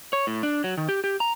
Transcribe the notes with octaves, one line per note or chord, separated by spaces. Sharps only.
C#5
A2
D4
F#3
D#3
G4
G4
A#5